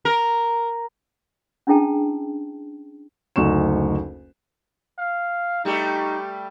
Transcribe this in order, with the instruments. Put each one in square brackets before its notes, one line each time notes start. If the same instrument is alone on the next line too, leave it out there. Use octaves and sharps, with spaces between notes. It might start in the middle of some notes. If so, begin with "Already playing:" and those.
[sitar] A#4
[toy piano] C#4 D4 E4 G#4 G5 A5
[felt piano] F#1 D2 D#4 C#6 E7
[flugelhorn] F5
[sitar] G3 A3 G4 [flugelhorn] D#4